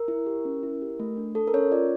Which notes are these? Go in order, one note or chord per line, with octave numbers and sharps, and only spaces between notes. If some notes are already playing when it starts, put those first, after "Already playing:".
Already playing: A#4
E4
G4
C#4
E4
G4
A3
D4
A4
A#4
C#4 C#5
F4 D5